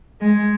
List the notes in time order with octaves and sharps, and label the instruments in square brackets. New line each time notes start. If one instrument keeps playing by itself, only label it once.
[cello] G#3